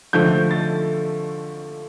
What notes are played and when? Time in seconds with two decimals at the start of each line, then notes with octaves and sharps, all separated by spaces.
0.13 D3 F3 A3 G6
0.51 A6